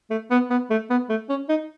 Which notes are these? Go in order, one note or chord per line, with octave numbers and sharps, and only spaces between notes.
A3
B3
B3
A3
B3
A3
C#4
D#4